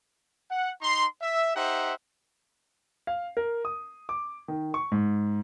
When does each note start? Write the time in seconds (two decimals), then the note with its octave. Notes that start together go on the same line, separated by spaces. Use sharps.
0.51 F#5
0.82 D#4 A#5 C6
1.22 E5
1.56 D#4 G4 C5 E5 F#5
3.07 F5
3.37 A#4
3.65 D#6
4.09 D6
4.48 D#3
4.74 C#6
4.92 G#2